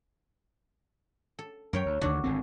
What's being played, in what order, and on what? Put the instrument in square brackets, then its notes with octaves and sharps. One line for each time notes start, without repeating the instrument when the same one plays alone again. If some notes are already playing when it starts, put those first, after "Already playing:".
[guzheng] A4
[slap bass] F#2 [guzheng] A#4 C#5 G5
[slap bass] D2
[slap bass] D2 D3 D#3 [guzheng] D4 F#4
[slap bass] G#1 D3 C4